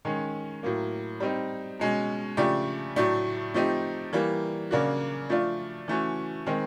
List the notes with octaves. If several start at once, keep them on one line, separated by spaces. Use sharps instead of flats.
D#3 G#3 C#4
A2 F#3 A#3
G3 C4 D#4
B2 G#3 C#4
C#3 F3 A3 D4 G4
A2 F#3 A3 D4
F3 A3 C4 D#4 G4
E3 G3 A#3
C#3 F#3 A#3 D4 F#4
F3 A3 D4 F4
E3 A3 C#4 F#4
D#3 G#3 C4